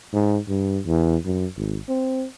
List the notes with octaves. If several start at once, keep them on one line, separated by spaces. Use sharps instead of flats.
G#2
G2
E2
F#2
G#1
C4